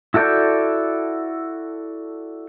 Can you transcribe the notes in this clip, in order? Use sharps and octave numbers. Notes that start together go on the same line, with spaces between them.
E4 F#4 A4 D5 G6